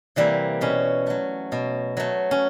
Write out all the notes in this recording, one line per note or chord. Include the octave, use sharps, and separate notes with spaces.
C3 E3 G3 A#3
B2 C#4
F#3 A3
B2
F#3 A3
C#4